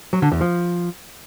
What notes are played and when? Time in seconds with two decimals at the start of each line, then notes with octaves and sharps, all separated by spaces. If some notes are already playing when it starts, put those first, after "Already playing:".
0.13 F#3
0.22 D3
0.32 E2
0.41 F3